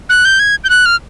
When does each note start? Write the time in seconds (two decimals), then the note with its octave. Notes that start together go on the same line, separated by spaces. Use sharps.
0.09 F#6
0.25 G6
0.39 G#6
0.64 G6
0.70 F#6
0.86 F6